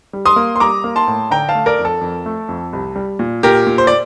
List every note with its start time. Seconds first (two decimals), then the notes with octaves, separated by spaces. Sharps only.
0.13 G3
0.26 C6 D#6
0.36 A#3
0.56 C6
0.60 G3 A#5 D6
0.84 A#3
0.96 A5 C6
1.07 A2
1.31 D3 G5 A#5
1.49 F5 A5
1.55 A3
1.66 A#4 D5
1.79 F2
1.85 A4
2.01 F2
2.26 A3
2.49 F2
2.73 C2
2.96 G3
3.19 A#2
3.43 A#2 G4 A#4
3.67 A#2
3.78 C5
3.87 D5